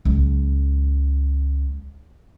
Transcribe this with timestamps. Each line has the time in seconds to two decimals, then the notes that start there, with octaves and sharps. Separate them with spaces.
0.05 C#2 F#3